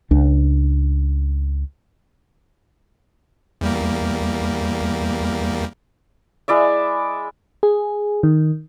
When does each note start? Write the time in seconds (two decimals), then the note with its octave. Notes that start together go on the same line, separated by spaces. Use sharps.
0.11 C#2 D4
3.61 E2 G3 A#3
6.48 G#3 E4 D5 E5
7.63 G#4
8.23 D#3